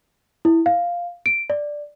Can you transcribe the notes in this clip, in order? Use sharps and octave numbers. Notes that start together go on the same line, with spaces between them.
E4
F5
D7
D5